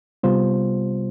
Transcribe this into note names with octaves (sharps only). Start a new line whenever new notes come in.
C3 G3 B3 F4 C5